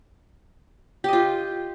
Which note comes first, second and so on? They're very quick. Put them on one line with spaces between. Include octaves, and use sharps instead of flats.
G4 D#5 F4